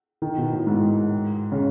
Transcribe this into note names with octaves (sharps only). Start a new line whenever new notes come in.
D#3
B2
A2
G#2
C#3